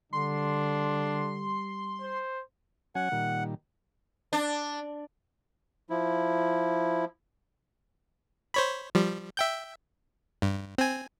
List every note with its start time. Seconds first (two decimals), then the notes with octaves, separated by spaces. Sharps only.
0.13 D3 G3 D4 C6
2.01 C5
2.95 F#3 C#4 F#5 G#5
3.12 A#2 D#3 G3
4.33 D4
5.90 F3 E4
8.54 C5 C#5 B5
8.95 F3 G3
9.37 E5 G5 G6
10.42 G2
10.78 C4 G#5